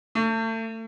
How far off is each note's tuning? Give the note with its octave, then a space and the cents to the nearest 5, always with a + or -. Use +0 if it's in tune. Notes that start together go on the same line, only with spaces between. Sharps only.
A3 +35